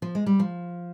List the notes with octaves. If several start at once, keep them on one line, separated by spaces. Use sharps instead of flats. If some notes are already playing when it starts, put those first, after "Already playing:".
F3
G#3
G3
F3